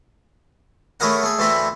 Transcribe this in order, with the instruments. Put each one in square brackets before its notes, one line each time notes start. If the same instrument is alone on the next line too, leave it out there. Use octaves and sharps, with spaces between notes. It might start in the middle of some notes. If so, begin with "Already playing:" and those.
[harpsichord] A3 C#4 E4 G#4 A#4 F#5
A3 G#4
D2 E3 A3 C4 E4 B5